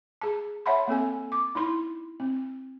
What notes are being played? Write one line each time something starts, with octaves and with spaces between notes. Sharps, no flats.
G#4 A5
C#5 E5 F#5 A5 B5 C6
A#3 C4 A4 G#5
D6
D#4 E4 C6
C4